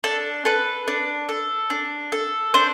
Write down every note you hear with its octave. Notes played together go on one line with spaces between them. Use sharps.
D4 A4
A4 B4
D4
A4
D4
A4
D4 C5